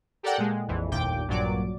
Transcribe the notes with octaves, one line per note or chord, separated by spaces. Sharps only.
G4 A4 A#4 D5 F#5 G5
A#2 G#3
A#1 F2 E3
G1 D#2 A#2 G5 D6
A#1 G2 A#2 F#3 D5 D6